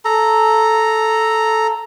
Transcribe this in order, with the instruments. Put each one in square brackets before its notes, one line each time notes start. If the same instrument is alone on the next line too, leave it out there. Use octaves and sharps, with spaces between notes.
[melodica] A4 A#5